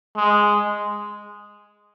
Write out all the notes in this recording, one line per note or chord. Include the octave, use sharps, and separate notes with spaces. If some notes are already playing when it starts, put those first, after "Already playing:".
G#3